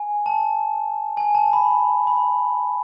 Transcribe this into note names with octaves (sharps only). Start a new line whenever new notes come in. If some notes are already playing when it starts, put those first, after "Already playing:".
Already playing: G#5
A5
G#5
A5
B5
B5
B5